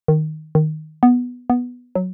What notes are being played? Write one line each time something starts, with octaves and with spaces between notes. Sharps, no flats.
D#3
D#3
B3
B3
F#3